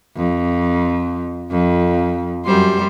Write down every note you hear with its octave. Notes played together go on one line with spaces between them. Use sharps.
F2
F2
F#2 G3 C5